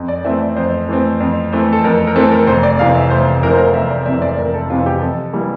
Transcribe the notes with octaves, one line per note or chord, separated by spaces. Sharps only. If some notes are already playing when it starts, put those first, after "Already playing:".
Already playing: F2
D5
E3 A3 C4 E5
D5
F2 C5
E3 A3 C4
F2
E3 A3 C4
A4
F2 A#4
A#4
E3 A3 C4 A4
A#4
F1 C5
D5
F2 C3 E3 F5
E5
F1 C5
F2 C3 E3 A#4
C5
A#4
F1 E5
D5
F2 C3 E3 E5
D5
F1 A#4
A4
F2 C3 E3 F4
G4
F2 A4
E3 G3 A#3